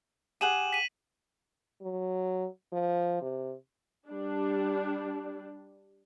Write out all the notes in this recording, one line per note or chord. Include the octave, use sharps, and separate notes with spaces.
G4 G#4 F#5 D#7 E7 F#7
B6 D#7
F#3
F3
C3
G3 D4